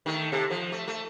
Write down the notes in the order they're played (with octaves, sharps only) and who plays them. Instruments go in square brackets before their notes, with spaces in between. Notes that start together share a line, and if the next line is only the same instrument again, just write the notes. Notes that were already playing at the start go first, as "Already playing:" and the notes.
[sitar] D#3 A3
C3 A4
F3
A3
A3